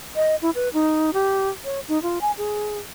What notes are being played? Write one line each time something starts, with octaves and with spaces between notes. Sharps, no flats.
D#5
E4
B4
D#4
G4
C#5
D#4
F4
G#5
G#4